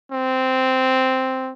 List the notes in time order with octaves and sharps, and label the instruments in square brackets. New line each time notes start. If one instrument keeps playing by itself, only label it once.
[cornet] C4